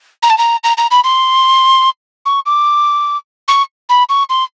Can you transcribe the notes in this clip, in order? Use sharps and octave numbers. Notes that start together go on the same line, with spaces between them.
A#5
A5
A#5
A#5
A#5
B5
C6
C#6
D6
C#6
B5
C#6
C6